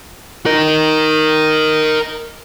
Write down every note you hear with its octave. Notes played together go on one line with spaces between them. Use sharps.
A#4 D#5